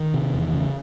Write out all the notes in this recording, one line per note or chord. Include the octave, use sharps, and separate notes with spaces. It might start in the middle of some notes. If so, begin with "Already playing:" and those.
Already playing: D#3
C3
E2
C#3